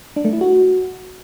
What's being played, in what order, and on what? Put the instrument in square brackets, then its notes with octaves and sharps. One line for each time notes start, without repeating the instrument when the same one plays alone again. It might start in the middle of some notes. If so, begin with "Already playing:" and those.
[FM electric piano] D4
A3
E4
F#4